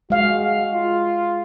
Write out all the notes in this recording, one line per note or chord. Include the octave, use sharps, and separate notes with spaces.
G#3 F#4 F5
F4